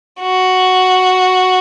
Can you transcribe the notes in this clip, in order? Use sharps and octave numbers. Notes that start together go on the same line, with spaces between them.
F#4